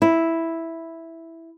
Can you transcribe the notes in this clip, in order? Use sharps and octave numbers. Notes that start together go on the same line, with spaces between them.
E4